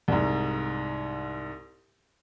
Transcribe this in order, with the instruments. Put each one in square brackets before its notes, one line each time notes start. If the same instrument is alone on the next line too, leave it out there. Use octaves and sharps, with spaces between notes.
[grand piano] C2 G#2